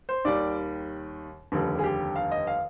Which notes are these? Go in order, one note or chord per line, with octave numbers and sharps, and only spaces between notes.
C5
D#2 D#3 G3 D5
F1 D#2 D3 G3
G#4
G4
F5
D#5
F5